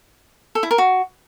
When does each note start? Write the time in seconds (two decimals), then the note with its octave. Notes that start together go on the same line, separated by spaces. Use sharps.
0.55 A4
0.63 E4
0.71 A#4
0.78 F#4